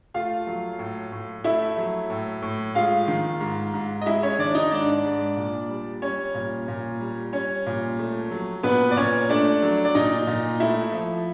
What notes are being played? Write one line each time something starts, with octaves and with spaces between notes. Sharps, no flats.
A3 F4 F5
F#3
A2
A2
A3 E4 E5
F#3
A2
A2
G#3 F4 F5
D#3
G#2
G#2
D#5
G#3 E4 E5
C#4 C#5
D#3 D4 D5
D#4 D#5
G#2 D4 D5
G#2
A#2
G3
G3 C#4 C#5
A#2
A#2
G3
G3 C#4 C#5
A#2
A3
F#3
A#2 B3 B4
D5
A#2 C#4 C#5
A3 D4 D5
F#3
D5
A#2 D#4 D#5
A#2
A3 E4 E5
F3